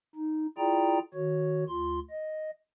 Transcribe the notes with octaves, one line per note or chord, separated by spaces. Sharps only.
D#4
E4 F4 G#4 D5 G5 A#5
D#3 F#4 C#5
D2 F4 C6
D#5